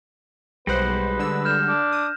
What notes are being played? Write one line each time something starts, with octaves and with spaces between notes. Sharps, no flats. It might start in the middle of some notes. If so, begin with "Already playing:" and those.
B1 G3 G#3 B4 C5 F#5 A#6
D3 E6
F6 G6 E7
D4
D#6